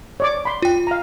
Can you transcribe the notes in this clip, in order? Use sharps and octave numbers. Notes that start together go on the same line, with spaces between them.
C#5 D5 D6
B5 C6
F4 G5
F5 A#5